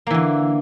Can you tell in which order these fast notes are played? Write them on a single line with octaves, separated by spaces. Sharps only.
A#3 E3 D3